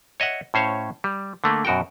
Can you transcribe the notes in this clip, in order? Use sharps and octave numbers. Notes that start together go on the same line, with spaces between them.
C#5 D#5 E5 F#5
A2 C#4 C5 C#5 F5
G3
D3 A3 A#3
F#2 B2 F#4 A#4 G5